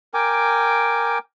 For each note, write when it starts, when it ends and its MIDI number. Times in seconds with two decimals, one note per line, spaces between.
0.14 1.18 70
0.14 1.18 79
0.14 1.18 80
0.14 1.18 86